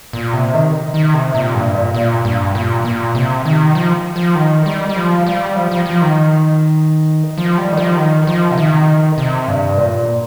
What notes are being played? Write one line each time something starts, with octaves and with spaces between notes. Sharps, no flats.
A#2
C3
D#3
D#3
C3
A#2
G2
A#2
A#2
G2
A#2
A#2
C3
D#3
F3
F3
D#3
G3
G3
F3
G3
F3
F3
F3
D#3
F3
G3
D#3
F3
D#3
F3
C3
D#3
C3
G2
A#2